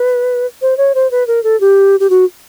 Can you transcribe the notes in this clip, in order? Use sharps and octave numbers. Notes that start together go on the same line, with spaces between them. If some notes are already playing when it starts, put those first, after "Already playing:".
Already playing: B4
C5
C#5
C5
B4
A#4
A4
G4
G4
F#4